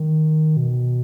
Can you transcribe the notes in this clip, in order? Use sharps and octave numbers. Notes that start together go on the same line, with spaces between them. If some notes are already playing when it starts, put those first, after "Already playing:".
Already playing: D#3
B2